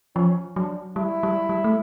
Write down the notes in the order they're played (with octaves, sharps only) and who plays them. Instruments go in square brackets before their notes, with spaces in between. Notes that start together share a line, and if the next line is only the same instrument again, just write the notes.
[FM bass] F3 [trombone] C#4
[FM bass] F#3 [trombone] D4
[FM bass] G3 [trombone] E4
[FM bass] G3
G3
A3